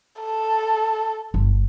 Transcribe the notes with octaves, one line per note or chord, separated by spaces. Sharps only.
A4
G1